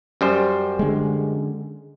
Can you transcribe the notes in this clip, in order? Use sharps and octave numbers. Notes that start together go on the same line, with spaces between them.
F#2 G3 C5
D3 G#3